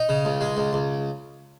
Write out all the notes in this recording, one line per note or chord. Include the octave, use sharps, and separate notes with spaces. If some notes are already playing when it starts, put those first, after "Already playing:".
Already playing: D#4
C#3
C#2
G#3
C#2
C#2